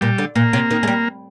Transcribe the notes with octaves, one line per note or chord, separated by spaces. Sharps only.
A#2 G3
D3
A#2 A#3
C3
D#3
G#3
G3